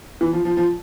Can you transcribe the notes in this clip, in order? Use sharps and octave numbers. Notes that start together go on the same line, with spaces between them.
E3
F3
F3
F3